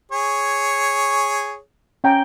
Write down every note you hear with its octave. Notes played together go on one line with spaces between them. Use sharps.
G#4 C#5
C#4 G5 A#5